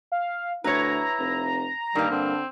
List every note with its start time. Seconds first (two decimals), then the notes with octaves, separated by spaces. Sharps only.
0.12 F5
0.64 D2 E4 B4 C#5 A#5
1.19 F1
1.95 G2 D#3 G3 A#3
2.11 D3 C4